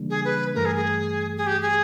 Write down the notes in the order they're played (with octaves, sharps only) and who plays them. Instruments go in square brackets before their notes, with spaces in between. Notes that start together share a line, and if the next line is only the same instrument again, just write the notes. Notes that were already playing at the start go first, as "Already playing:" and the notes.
Already playing: [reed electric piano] C#3 E3 G3 A#3 D4
[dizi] G#4
B4
[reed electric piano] G2 E3 A3 [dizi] A#4
[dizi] G#4
G#4
G#4
G4
G#4